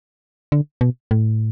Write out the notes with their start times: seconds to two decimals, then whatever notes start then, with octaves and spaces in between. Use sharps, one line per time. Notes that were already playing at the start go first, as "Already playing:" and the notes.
0.52 D3
0.81 B2
1.11 A2